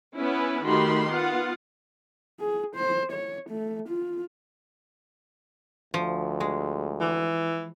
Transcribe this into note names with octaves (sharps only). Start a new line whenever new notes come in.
B3 C#4 E4 B4
D#3 A3 F#4 G4 B5 C6
B3 F4 F#5
G#4
C5
C#5
A3
F4
D2 F3
G#3
E3